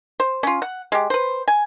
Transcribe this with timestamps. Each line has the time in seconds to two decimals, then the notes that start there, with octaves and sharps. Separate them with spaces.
0.20 C5
0.43 C#4 F4
0.62 F#5
0.92 G#3 G4
1.10 B4 C5
1.48 G#5